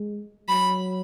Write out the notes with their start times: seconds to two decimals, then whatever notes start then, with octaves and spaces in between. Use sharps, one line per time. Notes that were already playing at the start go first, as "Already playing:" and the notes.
Already playing: G#3
0.48 F#3 B5